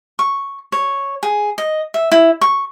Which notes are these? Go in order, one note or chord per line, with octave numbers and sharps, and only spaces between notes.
C#6
C#5
G#4
D#5
E5
E4
C#6